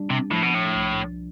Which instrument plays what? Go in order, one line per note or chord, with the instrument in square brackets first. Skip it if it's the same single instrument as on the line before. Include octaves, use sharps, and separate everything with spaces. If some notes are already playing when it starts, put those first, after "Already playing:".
Already playing: [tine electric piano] G3 D4
[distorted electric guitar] C3
[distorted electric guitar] A2 [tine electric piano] F3
[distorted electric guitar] B2
A2
[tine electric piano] C2